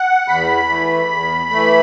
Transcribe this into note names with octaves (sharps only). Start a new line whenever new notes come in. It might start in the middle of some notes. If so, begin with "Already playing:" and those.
Already playing: F#5
E2 B5
E3 A3
E2
E3 A3